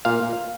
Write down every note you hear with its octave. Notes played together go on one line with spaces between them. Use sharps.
A#2 F5